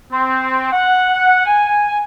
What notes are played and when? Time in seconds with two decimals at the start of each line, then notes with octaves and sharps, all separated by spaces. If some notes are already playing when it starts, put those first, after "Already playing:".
0.12 C4
0.72 F#5
1.46 G#5